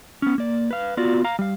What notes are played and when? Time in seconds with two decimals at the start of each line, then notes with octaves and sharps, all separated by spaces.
0.22 B3 C#4
0.38 A#3 D5
0.71 B4 F5
0.97 B3 F4 F#4 D5
1.24 F5 A#5
1.39 G3 F5